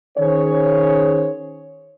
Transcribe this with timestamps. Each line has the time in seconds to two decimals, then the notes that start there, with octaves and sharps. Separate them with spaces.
0.17 D#3 C#4 G#4 C5 C#5